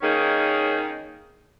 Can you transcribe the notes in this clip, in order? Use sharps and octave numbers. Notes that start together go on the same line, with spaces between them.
D#3 A#3 C#4 D#4 G#4